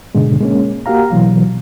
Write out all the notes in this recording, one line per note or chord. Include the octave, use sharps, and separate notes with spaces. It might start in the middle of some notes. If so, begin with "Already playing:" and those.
G#2 B2 D3 G#3
G#3 A#3 C#4
A#3 F#4 G4 F5 A#5
B2 E3 F#3